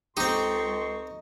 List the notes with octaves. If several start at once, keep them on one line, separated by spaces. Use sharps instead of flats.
C#2 G#3 C4 D#4 G4 A4 C6 C#6